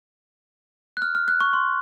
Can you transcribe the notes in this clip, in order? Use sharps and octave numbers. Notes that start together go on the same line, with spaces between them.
F#6
F6
F6
F#6
C#6
C6